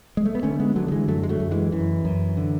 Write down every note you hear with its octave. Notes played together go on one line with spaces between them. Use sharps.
G#3
A3
B3
D3 A3 C#4
G#3 B3
D3 F#3 A3
F#3
E3 G#3
F#2 F#3 A3
G#3
F#3 A3
F#2
E3 G#3
F#2 E3
F#2
D3